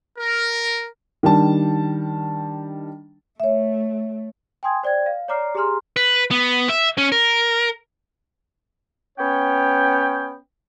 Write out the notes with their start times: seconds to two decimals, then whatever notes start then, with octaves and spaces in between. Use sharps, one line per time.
0.19 A#4
1.23 D#3 G3 D4 A5
3.40 A3 C#5 E5
4.63 G5 G#5 C6 D#6 G#6
4.83 C5 D5 G5 G#6
5.06 F5
5.28 C#5 D5 A#5 D6 F6 C7
5.55 G4 G#4 G#5 A#5 C6 F6
5.96 B4
6.31 B3
6.69 E5
6.98 C#4
7.12 A#4
9.18 B3 C#4 C#5 G5